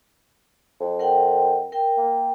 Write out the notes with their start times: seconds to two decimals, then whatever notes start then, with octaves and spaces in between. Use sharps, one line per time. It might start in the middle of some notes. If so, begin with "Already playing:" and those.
0.80 F2
0.99 A#4 F#5 G5
1.72 A#4 G5
1.97 A#3